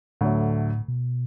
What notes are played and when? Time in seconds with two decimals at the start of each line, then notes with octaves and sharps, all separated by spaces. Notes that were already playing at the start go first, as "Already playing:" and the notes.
0.21 D2 A2 D3 F#3 A3
0.88 B2